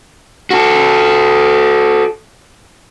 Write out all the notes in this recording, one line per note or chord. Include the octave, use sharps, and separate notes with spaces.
F#4 A4